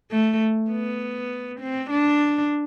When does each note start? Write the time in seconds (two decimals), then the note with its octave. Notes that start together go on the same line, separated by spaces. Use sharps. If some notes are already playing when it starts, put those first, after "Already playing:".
0.11 A3
0.71 B3
1.60 C4
1.90 D4